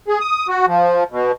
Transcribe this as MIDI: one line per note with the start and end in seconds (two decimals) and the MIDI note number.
0.08 0.19 68
0.20 0.47 87
0.48 0.66 66
0.67 1.04 53
1.11 1.32 47